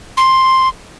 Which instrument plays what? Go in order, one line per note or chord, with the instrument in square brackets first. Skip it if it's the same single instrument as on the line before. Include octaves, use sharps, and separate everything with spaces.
[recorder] C6